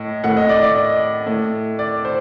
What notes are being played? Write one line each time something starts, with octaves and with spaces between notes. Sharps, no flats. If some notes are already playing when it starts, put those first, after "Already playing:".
Already playing: A2 D#5
A2 F#5
D#5
D5
D5
D#5
A2
D5
C5